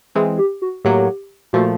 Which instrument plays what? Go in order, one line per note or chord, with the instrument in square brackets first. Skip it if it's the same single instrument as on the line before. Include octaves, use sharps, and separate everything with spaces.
[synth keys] E3 G#3 C4 [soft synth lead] G#4
[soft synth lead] G4
F#4
[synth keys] A2 F#3 A#3 [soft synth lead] G4
[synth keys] A#2 F3 A3 [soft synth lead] F#4